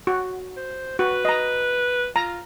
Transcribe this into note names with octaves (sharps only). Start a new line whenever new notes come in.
F#4
C5
F#4 B4
D#5 A#5
F4 A#5